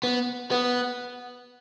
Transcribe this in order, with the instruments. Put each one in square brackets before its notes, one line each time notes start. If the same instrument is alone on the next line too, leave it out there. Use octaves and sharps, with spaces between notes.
[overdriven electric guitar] B3
B3